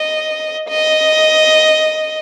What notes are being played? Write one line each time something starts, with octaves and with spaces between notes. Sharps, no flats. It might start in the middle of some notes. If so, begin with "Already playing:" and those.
Already playing: D#5
D#5